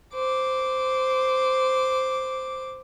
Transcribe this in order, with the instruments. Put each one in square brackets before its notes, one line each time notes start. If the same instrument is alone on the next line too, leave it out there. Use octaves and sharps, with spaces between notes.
[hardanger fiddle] C5 D6